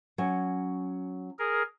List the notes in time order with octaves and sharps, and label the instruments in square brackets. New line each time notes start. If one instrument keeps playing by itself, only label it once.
[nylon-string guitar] F#3 C#4 G#5
[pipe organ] G#4 A#4